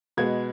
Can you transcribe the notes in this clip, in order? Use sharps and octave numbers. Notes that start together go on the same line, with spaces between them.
B2 G#3 B3 G#6